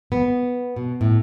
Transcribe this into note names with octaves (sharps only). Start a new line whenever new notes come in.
B3
B2
A2